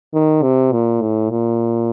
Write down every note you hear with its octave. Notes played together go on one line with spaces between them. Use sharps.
D#3
C3
A#2
A2
A#2